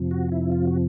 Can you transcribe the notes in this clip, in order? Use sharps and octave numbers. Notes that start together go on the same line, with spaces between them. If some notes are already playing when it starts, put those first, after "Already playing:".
Already playing: F2 C3 F3
F#4
E4
F4
F#4